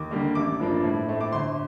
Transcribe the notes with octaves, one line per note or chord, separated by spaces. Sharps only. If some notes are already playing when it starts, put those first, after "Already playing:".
Already playing: D#2 D6
D3 G3 A#3
A1 D6
G2 F3 A#3 D4
A2
A3 C4
D6
G1 C6